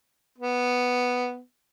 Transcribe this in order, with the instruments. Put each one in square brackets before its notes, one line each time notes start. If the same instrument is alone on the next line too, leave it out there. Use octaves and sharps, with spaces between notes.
[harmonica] B3